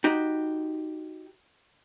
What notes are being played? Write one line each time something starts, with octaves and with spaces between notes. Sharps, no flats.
D#4 F#4 G4